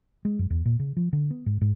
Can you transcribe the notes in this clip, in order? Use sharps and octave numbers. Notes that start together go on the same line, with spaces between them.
G#3
F#2
E2
A#2
C#3
F3
D3
B3
G#2
G#2